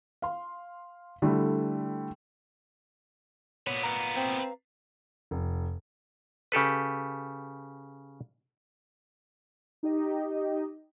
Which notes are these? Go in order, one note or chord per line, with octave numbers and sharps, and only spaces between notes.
F5 C6
D3 G3 A3 E4
A#2 B3 C#5
B4 F5 A#5
C4
F1
C#3 G4 A4 B4
D#4 G4 D#5